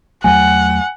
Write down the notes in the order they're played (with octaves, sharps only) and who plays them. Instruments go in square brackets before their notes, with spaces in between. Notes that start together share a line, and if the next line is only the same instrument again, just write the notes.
[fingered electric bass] E2 F#3 A3 [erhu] F#5 [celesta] G#5